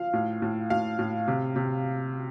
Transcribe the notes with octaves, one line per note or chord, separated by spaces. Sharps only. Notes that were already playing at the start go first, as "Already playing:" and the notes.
Already playing: F3 F5
A2
A2
A2 F5
A2
C3
C3